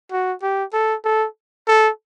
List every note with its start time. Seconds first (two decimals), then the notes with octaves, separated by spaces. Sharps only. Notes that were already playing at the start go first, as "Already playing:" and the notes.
0.12 F#4
0.42 G4
0.73 A4
1.04 A4
1.67 A4